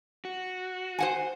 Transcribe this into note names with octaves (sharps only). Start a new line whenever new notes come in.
F#4
C5 F#5 G#5